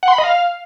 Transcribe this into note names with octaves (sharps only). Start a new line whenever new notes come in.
F#5
C6
B5
D#5
F5